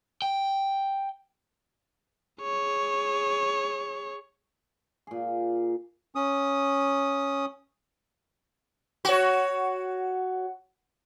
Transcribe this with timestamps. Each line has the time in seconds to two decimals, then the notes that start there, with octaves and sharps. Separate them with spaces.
0.22 G5
2.42 G#4 C#5
5.07 A#2 G#4
6.15 C#4 D#6
9.05 F#4 C#5